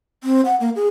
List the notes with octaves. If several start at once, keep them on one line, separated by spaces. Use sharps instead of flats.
C4
F#5
A#3
G#4